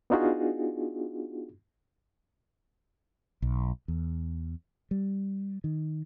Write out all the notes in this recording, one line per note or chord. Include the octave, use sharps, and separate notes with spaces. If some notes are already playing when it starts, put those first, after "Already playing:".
B3 D4 D#4 F4 F#4 G#4
B1
E2
G3
D#3